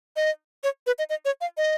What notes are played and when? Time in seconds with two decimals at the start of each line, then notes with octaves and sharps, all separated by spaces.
0.16 D#5
0.64 C#5
0.87 B4
0.99 D#5
1.10 D#5
1.25 C#5
1.41 F5
1.57 D#5